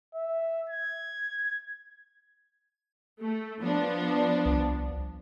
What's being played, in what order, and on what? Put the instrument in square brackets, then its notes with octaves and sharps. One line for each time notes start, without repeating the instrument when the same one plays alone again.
[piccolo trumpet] E5
G#6
[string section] A3
F3 B3 D4
[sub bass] C2